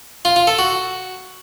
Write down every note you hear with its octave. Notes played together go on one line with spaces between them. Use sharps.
F4
F4
A4
F#4